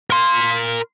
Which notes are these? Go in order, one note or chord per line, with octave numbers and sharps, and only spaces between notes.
A#4 C6